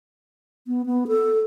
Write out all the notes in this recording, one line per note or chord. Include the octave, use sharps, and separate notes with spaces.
B3
B3
A4